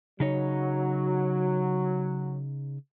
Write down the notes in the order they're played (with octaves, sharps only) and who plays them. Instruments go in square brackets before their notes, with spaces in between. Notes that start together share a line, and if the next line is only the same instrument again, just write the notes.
[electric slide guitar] C#3 D#4 C#5 [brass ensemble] F#3